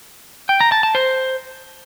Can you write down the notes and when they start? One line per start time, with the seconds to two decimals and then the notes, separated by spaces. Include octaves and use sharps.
0.49 G5
0.60 A#5
0.72 A5
0.83 A5
0.95 C5